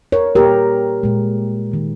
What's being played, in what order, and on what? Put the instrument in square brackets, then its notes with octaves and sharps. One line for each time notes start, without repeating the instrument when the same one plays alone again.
[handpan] A#4 C#5
A#2 G3 A#3 G4 A#4
A#2 G#3
D#3 A#3